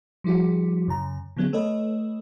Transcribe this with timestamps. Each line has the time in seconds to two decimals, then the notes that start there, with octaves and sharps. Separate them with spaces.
0.24 F3 G3 E4 F#4 G#4
0.88 F#2 C#3 A#5
1.37 D3 F#3 B3 C#4 G#4
1.53 A3 A4 B4 C#5 D#5